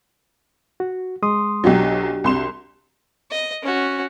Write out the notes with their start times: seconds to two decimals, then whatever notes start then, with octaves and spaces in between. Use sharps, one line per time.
0.80 F#4
1.23 G#3 C6 D#6
1.64 B1 F#3 D4 F#4 G4
2.24 C2 C6 E7
3.31 D#5
3.63 C#4 F#4